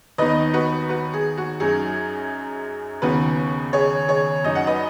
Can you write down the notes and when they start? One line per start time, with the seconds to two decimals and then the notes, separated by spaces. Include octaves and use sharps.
0.18 D#2 D#3 B3 D#4 B4 D#5
0.54 F#4 B4
0.89 F#4 B4
1.14 G#4
1.38 F#4
1.60 F#2 F#3 D#4 G#4
3.02 D#2 C#3 B3 D#4 F#4 B4
3.73 G#4 C#5
4.08 G#4 C#5
4.44 F#2 F#3 D#4 D#5
4.55 F#5
4.67 B4 D#5